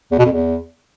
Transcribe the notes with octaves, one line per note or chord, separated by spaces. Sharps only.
E2
B2
F2
E2